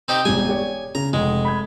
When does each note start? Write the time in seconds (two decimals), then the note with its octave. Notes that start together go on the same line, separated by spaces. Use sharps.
0.08 C4 D#4 G4
0.25 E1 G3 G#5
0.49 G4 C#5 D5
0.95 C#3 A#5
1.13 F1 G#3
1.45 B5 G#6